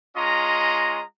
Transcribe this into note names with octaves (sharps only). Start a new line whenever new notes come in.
G#3 C#4 F4 D#5 A#5